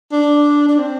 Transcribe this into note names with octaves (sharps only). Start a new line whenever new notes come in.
D4
D4
C4